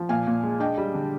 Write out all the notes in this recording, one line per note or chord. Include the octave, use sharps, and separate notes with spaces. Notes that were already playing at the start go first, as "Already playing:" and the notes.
Already playing: F3
A#2 F5 G#5
A#2
G#3
D4 D#5 G5
G3
D3